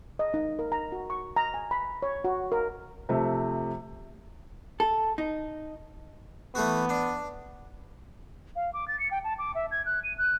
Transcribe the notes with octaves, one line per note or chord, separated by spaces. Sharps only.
D#5
D#4
A#4
A#5
F#4
C#6
A#5
G#5
B5
C#5
F#4
A#4
C3 F3 A3
A4
D#4
E3 A3 B3 F#4
D4
F5
D6
A6
C#7
G5
A5
D6
E5
G#6
F#6
D#7
F#6